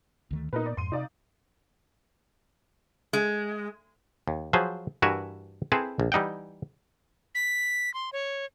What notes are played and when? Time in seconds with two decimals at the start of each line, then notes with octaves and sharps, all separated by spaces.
0.31 D2 D#3 A3
0.53 A#2 A#3 B3 D#4 A#4 B4
0.66 D5
0.77 F2 G#2 C6 D#7
0.92 C3 D#4 D5 F5
3.13 G#3
4.28 D#2
4.53 F3 F#3 G#4 B4 C5
5.02 G2 E3 F#4 A#4 E5 G#5
5.72 C4 E4 G#4 A4 B4 C5
6.00 A#1
6.12 E3 G3 D#4 F#5 G5
7.35 B6
7.94 C6
8.13 C#5